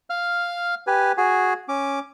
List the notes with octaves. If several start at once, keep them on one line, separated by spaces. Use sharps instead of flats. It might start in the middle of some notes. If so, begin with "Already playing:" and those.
F5 F6
G4 B4 G#5
F#4 G#4 G#5
C#4 D6